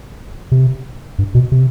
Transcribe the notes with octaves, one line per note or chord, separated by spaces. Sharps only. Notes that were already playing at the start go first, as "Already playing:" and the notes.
C3
G2
B2
C3